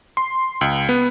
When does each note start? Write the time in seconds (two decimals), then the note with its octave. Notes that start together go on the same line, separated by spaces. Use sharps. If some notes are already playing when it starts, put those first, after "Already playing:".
0.17 C6
0.61 C#2
0.89 B3